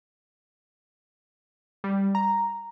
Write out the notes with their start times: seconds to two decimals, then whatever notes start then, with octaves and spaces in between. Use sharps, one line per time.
1.84 G3
2.15 A#5